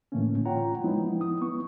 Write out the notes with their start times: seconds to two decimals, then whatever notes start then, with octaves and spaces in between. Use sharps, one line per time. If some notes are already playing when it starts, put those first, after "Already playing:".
0.12 A2 D3 E3 A3 A#3 C#4
0.45 F4 C#5 F#5 G5 A#5
0.84 F3 G#3 B3 D#4 E4
1.21 D#6
1.42 B3 C#6